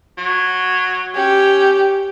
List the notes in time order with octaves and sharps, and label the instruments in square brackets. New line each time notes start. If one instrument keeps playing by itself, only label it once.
[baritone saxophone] F#3
[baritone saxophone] C#4 [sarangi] G4